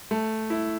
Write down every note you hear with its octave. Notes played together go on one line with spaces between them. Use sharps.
A3
E4